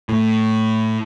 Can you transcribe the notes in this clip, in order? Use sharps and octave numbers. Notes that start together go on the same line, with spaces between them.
A2